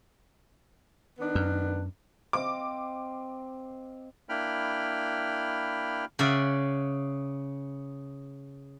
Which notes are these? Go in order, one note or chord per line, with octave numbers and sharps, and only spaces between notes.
D#3 B3 D4
F#2
C4 D#5 F5 D6
A#3 D4 E4 G5 B5 F6
C#3 D5 E5 F#5